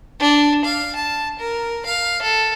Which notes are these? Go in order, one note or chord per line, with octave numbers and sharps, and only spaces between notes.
D4
F5
A5
A#4
F5
A4